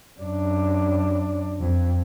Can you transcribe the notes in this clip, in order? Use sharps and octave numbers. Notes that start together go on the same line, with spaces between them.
F#2 D4
F2